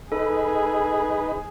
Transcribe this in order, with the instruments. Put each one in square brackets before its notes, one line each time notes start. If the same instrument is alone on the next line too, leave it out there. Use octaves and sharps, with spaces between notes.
[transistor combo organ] D#4 B4 [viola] G#4 [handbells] A4